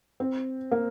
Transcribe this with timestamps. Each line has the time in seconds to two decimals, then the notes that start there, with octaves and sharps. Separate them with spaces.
0.20 C4
0.72 A#3